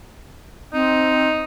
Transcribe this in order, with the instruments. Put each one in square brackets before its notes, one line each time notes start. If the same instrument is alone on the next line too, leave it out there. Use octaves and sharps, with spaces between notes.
[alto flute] C4 [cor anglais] D#4